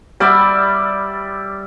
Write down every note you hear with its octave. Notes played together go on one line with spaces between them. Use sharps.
G3 D5 E5